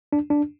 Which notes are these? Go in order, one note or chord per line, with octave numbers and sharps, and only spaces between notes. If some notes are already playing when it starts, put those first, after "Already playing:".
D4
D4